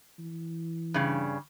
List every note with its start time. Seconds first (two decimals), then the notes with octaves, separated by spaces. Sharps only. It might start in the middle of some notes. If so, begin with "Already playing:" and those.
0.19 E3
0.94 G2 C#3